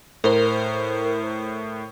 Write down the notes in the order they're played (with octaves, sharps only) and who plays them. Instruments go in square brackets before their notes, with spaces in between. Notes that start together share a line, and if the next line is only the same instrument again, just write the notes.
[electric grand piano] A2 [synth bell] A#4 C5